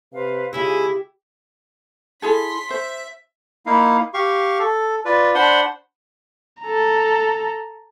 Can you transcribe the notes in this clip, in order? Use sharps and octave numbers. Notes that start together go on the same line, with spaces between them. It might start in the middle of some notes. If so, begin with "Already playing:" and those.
C3 B4 C5 F5
C#3 G#3 E4 F4 G4 G#4
E4 G#4 A4 C6 B6
C5 E5
A#3 D#4 E4 F5
G4 F5 C#6
A4
F4 B4 D5
D4 C5 F#5 B5 C6
A4 A#5